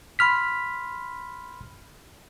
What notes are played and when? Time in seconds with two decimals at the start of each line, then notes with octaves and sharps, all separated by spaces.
0.19 B5 C6 F6 B6